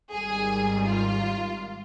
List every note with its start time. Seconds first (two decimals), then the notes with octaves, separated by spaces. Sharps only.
0.11 G#1 G#2 D#3 G3 G#4
0.86 F4